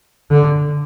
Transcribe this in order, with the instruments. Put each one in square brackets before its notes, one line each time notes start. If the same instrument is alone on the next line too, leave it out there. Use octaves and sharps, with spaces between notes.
[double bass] D3